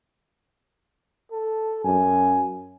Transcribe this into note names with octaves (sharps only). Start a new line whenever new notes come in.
A4
F#2 G#5